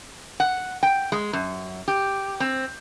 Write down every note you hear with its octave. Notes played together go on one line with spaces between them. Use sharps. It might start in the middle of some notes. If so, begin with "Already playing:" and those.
F#5
G5
G#3
F#2
G4
C4